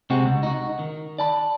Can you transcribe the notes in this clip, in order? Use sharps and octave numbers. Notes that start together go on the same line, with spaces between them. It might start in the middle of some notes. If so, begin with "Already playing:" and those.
C3 G#3 C4 F#4
C#2
D#4 F#4
D#3
D5 A5 B5